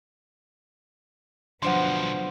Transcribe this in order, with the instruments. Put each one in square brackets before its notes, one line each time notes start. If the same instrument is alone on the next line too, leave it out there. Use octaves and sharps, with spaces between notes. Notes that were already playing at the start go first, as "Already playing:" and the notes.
[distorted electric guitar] D2 B2 [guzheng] D3 F3 B3 [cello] F#3 [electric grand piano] F#5 C6